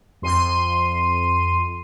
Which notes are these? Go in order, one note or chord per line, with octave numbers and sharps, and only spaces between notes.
F2 C6 D#7